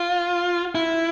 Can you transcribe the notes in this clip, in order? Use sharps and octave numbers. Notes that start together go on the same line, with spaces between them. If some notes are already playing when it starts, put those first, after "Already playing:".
Already playing: F4
E4